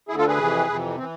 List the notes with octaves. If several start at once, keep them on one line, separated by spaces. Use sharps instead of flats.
D2 D3 E4 G#4
F4 A4
G#4 B4
F2 C3 E3
F2 C3 E3
E3 C4